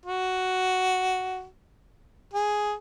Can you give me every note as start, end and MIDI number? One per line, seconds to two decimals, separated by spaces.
0.06 1.46 66
2.34 2.74 68